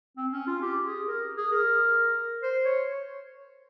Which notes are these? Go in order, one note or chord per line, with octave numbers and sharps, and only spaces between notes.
C4
C#4
F4
G4
G#4
A#4
G#4
A#4
C5
C#5